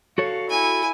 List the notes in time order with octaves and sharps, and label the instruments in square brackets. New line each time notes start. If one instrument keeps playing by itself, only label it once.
[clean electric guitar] F#4 A4 C#5 [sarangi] F5
[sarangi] E4 [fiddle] G#5